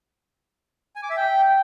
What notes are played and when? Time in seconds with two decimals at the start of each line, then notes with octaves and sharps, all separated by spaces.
0.96 G#5
1.03 D6
1.10 E5
1.17 G5